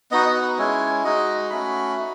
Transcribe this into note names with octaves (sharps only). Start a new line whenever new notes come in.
B3 D#4 F#4 D#5
D#5
B4
G#3 C#4 E4 C#5
G#3 D#4 F#4 D#5
A3 C#4 F#4 B5
D#4 F#4